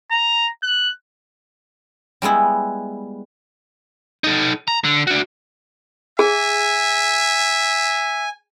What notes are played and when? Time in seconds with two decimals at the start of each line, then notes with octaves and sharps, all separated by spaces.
0.11 A#5
0.63 F#6
2.22 G3 G#3 B3 E4
4.24 D#4 A4
4.68 A#5
4.84 D3
5.07 D4 F#4
6.19 G#4 E5 G#5